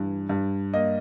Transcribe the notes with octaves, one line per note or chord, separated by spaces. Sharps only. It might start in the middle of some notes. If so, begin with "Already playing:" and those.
Already playing: G2 E3
G2
A#3 D#5